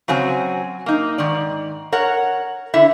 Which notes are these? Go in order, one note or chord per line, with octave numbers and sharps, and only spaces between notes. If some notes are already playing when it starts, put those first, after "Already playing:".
C#3 F#3 C4 G#5
A#3 D#4
G#2 D#3 D5
A#4 C#5 F#5
D3 E4 E5